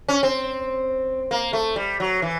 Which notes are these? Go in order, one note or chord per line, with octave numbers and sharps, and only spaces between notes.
C#4
C4
A#3
A3
G3
F#3
E3